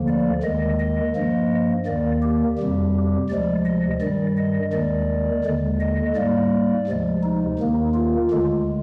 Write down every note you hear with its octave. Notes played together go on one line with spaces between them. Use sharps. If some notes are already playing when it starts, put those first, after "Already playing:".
Already playing: D2 D3 F3 A#3
D5
D#2 D#3 G#3 D#5
D#5
G2 F3 A#3
D#2 D#3 A#3 D5
G4
F2 C3 G3
D2 C3 F3 G#3 D5
D#5
G2 D#3 G3 D5
D#5
D#2 D#3 G#3 D5
D#2 D3 G#3
D#5
G#2 G3 A#3 D5
D2 C3 F3 G#3
D#4
D#2 D#3 A#3
F4
D2 D3 G#3